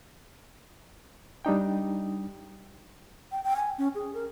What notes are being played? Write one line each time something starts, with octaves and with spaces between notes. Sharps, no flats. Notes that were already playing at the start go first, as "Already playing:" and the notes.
G3 D4 D#4 G5
G5
G5
G#5
C#4
G#4
A#4